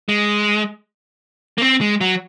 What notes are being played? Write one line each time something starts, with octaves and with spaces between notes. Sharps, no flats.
G#3
A#3
C4
G#3
F#3